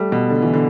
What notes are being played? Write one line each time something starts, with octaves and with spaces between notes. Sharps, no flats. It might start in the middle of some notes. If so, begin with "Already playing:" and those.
Already playing: G3 A3
B2
D3
E3
D3